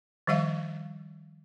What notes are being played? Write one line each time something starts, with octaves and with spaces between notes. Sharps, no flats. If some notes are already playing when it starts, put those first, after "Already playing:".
D#3 F3 G3 E5 F5